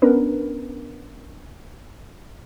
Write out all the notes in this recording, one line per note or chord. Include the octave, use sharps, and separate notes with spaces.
B3 C#4 D4 A#4 B4